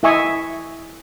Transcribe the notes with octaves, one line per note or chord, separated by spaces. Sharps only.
E4 D#5 E5 G#5 C#6 D#6